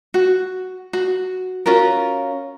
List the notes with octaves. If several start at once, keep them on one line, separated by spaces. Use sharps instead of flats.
F#4
F#4
C#4 F4 F#4 A#4